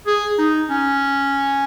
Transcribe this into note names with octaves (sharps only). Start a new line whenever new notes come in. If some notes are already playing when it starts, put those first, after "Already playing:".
G#4
D#4
C#4